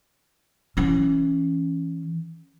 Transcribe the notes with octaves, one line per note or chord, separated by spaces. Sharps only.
E3 C#4